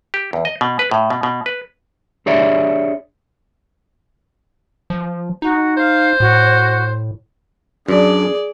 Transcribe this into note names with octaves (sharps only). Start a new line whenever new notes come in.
G4
E2
D#5
B2
B4
A2
B2
B2
B4
D4 G4 G#4 C#5 D5 E5
F3
D#4 F#4
C5 F5
A2 F#4
F#2 D4 G#4 D5